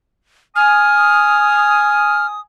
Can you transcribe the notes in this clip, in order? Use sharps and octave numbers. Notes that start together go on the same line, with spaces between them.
G#5 D#6 F6